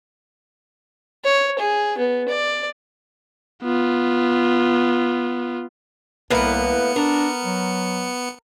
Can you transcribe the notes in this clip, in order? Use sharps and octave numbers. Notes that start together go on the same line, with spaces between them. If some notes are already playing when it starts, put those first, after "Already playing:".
C#5
G#4
B3
D5
B3 F4
C2 A2 A#3 B3 B4 C#7
D4 A#4
F#3